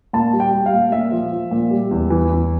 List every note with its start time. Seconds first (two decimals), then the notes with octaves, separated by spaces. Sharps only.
0.13 A#2 A5
0.33 G3
0.40 G5
0.53 G3
0.66 F5
0.72 A#2
0.92 A#2 E5
1.12 F3
1.32 F3
1.51 A#2
1.71 G3
1.91 E2
2.10 E3
2.30 E2